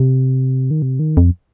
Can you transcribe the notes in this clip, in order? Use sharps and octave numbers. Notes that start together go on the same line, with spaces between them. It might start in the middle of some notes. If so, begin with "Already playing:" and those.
Already playing: C3
D#3
C3
D#3
F2